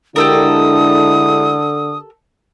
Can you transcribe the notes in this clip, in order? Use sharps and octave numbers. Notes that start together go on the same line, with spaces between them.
D3 G#3 D4 E4 G4 A4 A#4 D#6